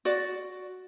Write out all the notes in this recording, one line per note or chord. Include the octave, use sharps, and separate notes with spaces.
F#4 D5